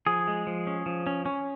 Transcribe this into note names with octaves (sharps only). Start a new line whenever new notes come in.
F3 G#4
G#3
F3
C#4
F3
C#4
C#4